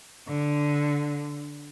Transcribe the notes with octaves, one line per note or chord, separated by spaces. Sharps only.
D3